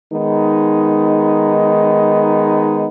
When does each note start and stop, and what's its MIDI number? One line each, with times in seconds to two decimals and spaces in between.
0.12 2.87 51
0.12 2.87 56
0.12 2.87 59
0.12 2.87 63